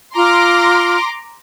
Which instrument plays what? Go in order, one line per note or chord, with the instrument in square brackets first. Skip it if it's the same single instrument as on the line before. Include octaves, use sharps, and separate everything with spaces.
[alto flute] F4 [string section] A#5 C6 D6